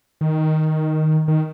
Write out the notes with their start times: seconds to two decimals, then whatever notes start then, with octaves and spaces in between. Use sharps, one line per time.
0.21 D#3
1.28 D#3